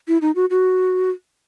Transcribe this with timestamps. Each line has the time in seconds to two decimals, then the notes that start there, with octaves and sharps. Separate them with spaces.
0.08 E4
0.21 D#4
0.36 F#4
0.50 F#4